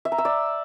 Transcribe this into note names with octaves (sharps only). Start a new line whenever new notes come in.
E5
A#5
E6
D5